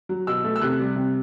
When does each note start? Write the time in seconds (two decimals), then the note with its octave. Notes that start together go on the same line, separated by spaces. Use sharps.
0.09 F#3
0.27 B2 E6
0.44 A3
0.56 E6
0.61 C3 F#6
0.79 G3
0.96 C3